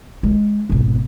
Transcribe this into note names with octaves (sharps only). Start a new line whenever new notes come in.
G#3
G#1 B2